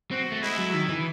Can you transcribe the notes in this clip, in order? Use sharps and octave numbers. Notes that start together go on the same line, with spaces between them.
C4 F#4
A3
G#3 E4
F#3
D#3
E3